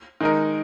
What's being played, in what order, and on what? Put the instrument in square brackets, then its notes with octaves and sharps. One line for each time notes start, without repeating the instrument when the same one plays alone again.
[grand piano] D#3 G#3 D#4 A#4